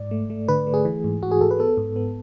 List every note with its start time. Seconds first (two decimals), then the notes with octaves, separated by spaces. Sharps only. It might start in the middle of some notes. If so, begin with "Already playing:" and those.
Already playing: G#2 D5
0.11 A3
0.30 A3
0.48 D3 B4
0.67 A3
0.74 G#4
0.85 E3
1.04 G#2
1.22 G#2 F#4
1.31 G#4
1.41 G#2 A4
1.51 B4
1.59 B3 A4
1.77 G#2
1.96 B3